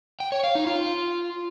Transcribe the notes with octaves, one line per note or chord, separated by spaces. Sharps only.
G5
C#5
F5
D#4
F4